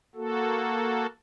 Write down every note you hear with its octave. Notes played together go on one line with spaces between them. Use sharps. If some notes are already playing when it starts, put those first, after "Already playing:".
A#3 F#4 A4